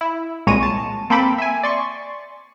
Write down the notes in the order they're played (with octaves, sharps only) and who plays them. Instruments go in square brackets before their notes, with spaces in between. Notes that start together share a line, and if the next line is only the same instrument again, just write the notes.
[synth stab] E4
C2 A#2 G#3 C#5 A#6 D#7
A5
A#3 C4 A4 G5 B5 A6
E5 G#5
D5 C6 C#6